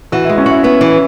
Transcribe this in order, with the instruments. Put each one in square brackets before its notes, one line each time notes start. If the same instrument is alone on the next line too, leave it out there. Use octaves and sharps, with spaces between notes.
[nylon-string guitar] E3 [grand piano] F#4
[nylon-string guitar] G#3 [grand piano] E4
[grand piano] C#4
[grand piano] E4 [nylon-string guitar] F#4
[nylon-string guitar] B3 [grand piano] E5
[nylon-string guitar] E3